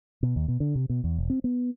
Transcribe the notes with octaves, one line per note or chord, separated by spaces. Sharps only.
B2
D#2
B2
D3
C3
B2
E2
E1
C4
B3